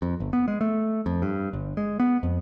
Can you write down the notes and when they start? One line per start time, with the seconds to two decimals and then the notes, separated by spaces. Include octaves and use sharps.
0.02 F2
0.20 G1
0.33 B3
0.48 G#3
0.61 A3
1.06 F2
1.22 G2
1.53 G1
1.77 G#3
2.00 B3
2.23 F2